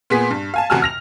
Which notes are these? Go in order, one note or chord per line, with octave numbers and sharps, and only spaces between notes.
A#2 B3 G#4 B6
G2
F5 G#5 A5
A1 C3 F#4 G#5 A5 F6
F6 A#6 F7